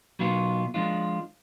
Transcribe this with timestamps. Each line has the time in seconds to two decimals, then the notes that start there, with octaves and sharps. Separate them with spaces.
0.19 B2 F#3 B3 F4
0.74 F3 G#3 D4 F4